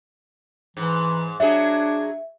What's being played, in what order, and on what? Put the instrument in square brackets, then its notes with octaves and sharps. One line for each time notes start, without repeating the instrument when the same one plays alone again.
[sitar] G#2 [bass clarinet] E3
[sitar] F#3 G#4 [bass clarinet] D4 [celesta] E5